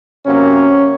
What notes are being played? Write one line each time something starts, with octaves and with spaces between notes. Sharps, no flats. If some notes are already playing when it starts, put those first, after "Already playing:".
C3 F#3 A#3 C#4